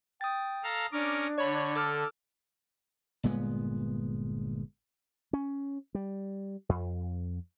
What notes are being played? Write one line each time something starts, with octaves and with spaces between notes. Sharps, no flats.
G5 D#6 A6
A4 F5 A#5
C#4 D4 A#4 D6
D3 C#5 D5 B5
A4 D6 E6 F6
G1 A#2 G#3 B3
C#4
G3
F2